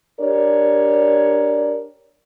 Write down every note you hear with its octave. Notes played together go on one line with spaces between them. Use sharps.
D4 G4 A#4 C#5 D5